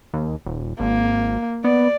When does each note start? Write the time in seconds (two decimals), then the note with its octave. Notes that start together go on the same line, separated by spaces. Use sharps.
0.13 D#2
0.45 D#1
0.79 G#1 A#3
1.64 B3 D5